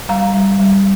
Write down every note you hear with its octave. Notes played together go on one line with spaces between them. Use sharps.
G3 F5 A#5
G3
G3